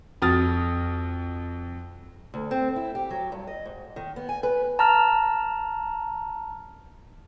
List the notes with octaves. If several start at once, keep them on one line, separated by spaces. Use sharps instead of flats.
F2 F#4 D#6 F6 A6
D2
C4
E4
G4
F#3
G2
D#5
G#2
D#3
B3
G#5
B4
A5 A#5 F6